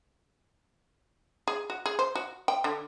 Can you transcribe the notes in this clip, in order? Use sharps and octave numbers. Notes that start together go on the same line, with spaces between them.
G#4
F#4
G#4
C5
F#4
G5
D3